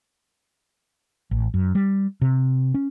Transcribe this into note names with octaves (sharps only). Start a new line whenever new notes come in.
A1
F#2
G3
C3
C#4